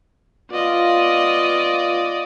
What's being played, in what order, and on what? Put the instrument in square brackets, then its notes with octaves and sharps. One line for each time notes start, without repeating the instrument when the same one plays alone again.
[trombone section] B3 F4 [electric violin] D5 D#5